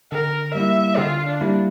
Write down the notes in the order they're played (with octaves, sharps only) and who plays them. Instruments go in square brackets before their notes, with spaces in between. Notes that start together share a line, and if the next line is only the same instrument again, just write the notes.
[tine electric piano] D3 [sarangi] A#4
[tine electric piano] G3 A#3 E4 [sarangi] E5
[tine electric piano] D3 [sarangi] F4
[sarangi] D4
[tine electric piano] G3 A#3 E4